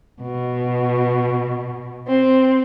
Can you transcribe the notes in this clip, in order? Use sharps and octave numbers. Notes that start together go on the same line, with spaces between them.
B2
C4